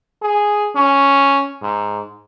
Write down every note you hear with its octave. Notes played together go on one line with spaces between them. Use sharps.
G#4
C#4
G#2